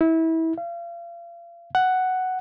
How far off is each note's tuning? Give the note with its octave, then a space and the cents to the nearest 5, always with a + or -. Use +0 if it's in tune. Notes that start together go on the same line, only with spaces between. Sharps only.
E4 -25
F5 -35
F#5 +5